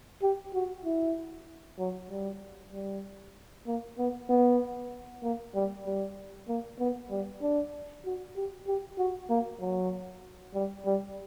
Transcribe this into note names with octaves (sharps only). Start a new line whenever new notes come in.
G4
F#4
E4
F#3
G3
G3
A#3
B3
B3
A#3
G3
G3
A#3
B3
G3
D4
F#4
G4
G4
F#4
A#3
F#3
G3
G3